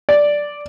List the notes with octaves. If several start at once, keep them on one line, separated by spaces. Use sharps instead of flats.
D5